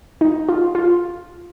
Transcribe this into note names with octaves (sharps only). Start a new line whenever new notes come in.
D#4
F4
F4